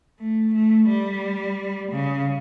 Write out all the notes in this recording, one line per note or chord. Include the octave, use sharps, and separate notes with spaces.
A3
A3
G3
C#3